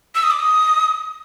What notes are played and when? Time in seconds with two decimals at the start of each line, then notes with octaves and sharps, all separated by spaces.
0.15 E6
0.23 D#6
0.31 D6
0.40 D#6